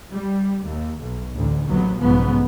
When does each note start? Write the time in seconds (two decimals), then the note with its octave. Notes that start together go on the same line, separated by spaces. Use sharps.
0.11 G3
0.66 D#2
1.00 B1
1.35 A1 D2
1.68 A1 D#2 C3 F#3 B3
1.98 B1 G#2 C#3 F3 B3